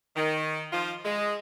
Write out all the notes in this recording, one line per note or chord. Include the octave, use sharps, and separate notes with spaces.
D#3
F3 D#4 F4
G#3